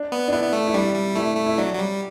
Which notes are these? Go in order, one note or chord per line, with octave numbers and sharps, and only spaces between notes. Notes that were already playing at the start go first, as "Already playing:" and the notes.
Already playing: D4
B3
D4
B3 E4
B3
A3
E4
G3 D4
G3
A3 E4
A3
E4
F#3 D4
F#3
G3